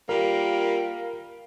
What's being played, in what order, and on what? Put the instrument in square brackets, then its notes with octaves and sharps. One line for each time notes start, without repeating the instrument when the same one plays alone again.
[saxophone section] G3 A#3 F4 [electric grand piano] A#4